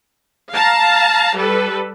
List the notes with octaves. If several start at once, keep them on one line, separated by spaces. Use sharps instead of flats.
F5 A5 A#5
G3 A4 B4